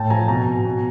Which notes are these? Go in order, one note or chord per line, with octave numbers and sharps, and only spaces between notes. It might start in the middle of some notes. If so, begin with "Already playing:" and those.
Already playing: A2 G5 A5
F3 G#5 A#5
B2 G#5 A#5
B2
B2